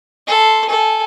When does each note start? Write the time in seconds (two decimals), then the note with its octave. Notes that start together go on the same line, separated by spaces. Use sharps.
0.27 A4 C6
0.69 A4 G#5